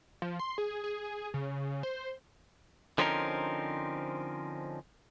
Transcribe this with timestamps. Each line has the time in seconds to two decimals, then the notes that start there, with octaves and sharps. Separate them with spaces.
0.22 F3
0.39 C6
0.58 G#4
0.84 G#4
1.34 C#3
1.83 C5
2.98 D3 F3 C4 C#4 D#4 A#4